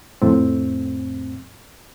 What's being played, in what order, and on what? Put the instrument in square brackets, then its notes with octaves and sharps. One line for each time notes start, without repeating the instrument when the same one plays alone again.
[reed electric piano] F2 A2 C4